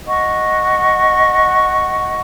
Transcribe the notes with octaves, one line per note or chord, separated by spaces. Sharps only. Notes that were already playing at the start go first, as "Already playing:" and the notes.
D#5 F#5 C#6